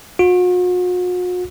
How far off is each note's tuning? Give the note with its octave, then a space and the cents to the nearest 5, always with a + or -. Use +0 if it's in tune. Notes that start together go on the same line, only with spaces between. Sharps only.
F#4 -45